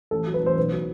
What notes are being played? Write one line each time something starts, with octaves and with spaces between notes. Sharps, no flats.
A1 A4
F#3
B4
A1 C5
B1 B4
F#3